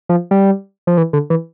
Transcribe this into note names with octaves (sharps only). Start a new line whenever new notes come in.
F3
G3
F3
E3
D3
E3